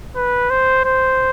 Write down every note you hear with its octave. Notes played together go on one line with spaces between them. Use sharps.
B4
C5
C5